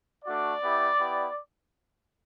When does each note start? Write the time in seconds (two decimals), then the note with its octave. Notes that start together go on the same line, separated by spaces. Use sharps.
0.24 A3 D4 F#4 D5
0.60 B3 E4 G4
0.97 B3 E4 G4